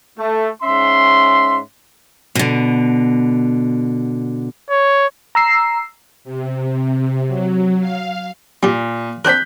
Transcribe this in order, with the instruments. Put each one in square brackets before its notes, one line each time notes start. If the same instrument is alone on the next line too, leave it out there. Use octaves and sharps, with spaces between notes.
[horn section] A3
G#2 C#4 E5 C6
[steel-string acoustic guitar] B2 D3
[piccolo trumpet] C#5
[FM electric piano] A#5 E6 C7
[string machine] C3
F#3
F5
[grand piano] A#2 [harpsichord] G3 G4
[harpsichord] C4 D4 A#4 [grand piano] F#6 G6 B6